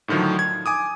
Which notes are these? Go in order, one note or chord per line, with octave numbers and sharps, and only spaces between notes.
A2 D3 D#3 F3 F#3
G#6
G#5 D6 D#6